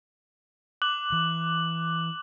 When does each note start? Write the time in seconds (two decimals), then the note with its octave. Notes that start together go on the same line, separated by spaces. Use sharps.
0.82 D6 F#6 F#7
1.12 E3